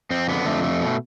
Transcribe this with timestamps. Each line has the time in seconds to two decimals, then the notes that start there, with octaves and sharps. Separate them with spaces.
0.11 F2 C4
0.29 D3 B3
0.45 F2 A3
0.63 A3
0.81 B2